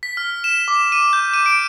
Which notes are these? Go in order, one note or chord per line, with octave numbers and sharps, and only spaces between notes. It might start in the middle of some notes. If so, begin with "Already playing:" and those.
B6
F6
E7
D6
D#7
G6
D#7
D7